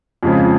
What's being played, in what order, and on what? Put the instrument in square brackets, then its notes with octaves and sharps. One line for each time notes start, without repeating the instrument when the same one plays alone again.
[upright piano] F2 C#3 G#3 C4 F4